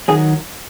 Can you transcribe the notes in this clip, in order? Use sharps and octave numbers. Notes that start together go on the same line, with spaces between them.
D#3 F#3 G#4